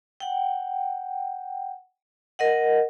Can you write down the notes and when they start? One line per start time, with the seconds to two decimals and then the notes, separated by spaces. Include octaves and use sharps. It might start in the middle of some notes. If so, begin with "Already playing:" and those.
0.20 F#5 G5
2.39 A#4 D#5 F#5